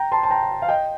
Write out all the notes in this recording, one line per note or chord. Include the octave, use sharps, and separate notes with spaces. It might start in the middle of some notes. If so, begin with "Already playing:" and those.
Already playing: G5 A#5
A5 C6
A5
G5 A#5
F5
D#5 G5